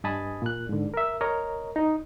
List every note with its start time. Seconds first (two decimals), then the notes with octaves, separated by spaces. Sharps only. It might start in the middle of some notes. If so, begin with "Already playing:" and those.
0.04 G2 D#5 G#5 A5 B5 D#6
0.42 A#2 F#6
0.69 G#2 D3
0.94 A#4 E5
1.21 A#4 C#5 D#5 A#5
1.76 D#4